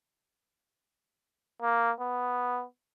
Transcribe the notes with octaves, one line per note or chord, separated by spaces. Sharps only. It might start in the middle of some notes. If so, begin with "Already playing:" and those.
A#3
B3